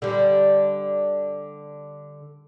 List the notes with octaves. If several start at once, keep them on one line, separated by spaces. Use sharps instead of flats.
D3 G3